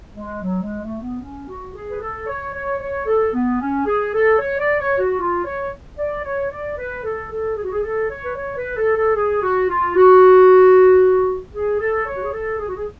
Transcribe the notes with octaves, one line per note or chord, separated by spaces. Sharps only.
G#3
F#3
G#3
A3
B3
C#4
F#4
G#4
B4
A4
C#5
C#5
C#5
A4
B3
C#4
G#4
A4
C#5
D5
C#5
F#4
F4
C#5
D5
C#5
D5
B4
A4
A4
G#4
F#4
G#4
A4
C#5
B4
C#5
B4
A4
A4
G#4
F#4
F4
F#4
G#4
A4
C#5
F#4
G#4
A4
G#4
F#4
G#4